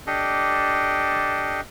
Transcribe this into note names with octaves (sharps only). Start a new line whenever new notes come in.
D4 G4 A4 D#5